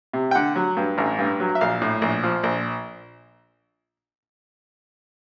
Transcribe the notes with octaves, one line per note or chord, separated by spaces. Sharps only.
C3
G5
D3 F#5
F#3
G2
A1
G2
F#3
E5
A#1 F5
A2
A#1
F3
A#1